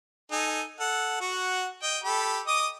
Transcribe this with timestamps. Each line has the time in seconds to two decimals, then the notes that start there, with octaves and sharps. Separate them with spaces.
0.32 D#4 A4 G#5
0.80 A4 F#5
1.21 F#4 F#5
1.83 D#5 G5
2.04 G4 A4 B5
2.47 D#5 D6 D#6